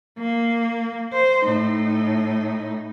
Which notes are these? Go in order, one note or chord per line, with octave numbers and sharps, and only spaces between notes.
A#3
C5
A2 D#4